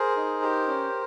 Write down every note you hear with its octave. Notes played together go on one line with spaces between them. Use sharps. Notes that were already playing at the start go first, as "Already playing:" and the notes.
Already playing: G#4 A#4 C5
D#4
G4
C#4